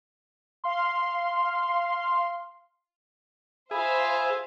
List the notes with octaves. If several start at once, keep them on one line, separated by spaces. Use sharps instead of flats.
F5 C6
F4 G#4 C5 E5 F5 B5